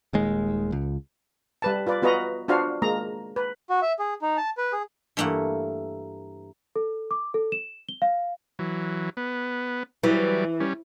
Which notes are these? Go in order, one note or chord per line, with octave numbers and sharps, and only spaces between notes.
D#1 D#2 G#3
C#2
G3 B4 A5
F4 B4 D5
B3 F4 F#4 B4 D#5 A#5
D4 F4 F#4 C5 F5
G#3 A#3 A#5
B4
F#4
E5
G#4
D#4
A5
B4
G#4
G2 E3 A3 A#3 F#5
A4
D6
A4
E7
G7
F5
E3 F#3
B3
E3 F#3 G3 D5
G3 C#4